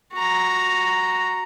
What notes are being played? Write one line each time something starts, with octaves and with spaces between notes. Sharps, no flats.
F#4 A#5